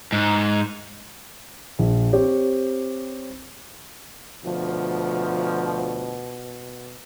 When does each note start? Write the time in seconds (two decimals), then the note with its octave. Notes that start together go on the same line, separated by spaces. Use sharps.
0.13 G#2
1.79 A#1
2.13 C4 G4 C5 C#5
4.45 D2 B2 F3